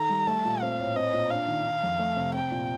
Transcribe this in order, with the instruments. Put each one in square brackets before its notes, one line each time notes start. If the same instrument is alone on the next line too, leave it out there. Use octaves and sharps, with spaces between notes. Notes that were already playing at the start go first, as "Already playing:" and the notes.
Already playing: [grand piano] D#3 A4 [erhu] A#5
[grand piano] G3
[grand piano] A3 [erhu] A5
[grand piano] A#2
[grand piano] C4 [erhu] F5
[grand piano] A2
[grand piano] C4 [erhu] D#5
[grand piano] A#2
[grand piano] D4 [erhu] F5
[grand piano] D#3
D#3
F2
A3
C3
[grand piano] C4 [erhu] G5
[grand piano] A#2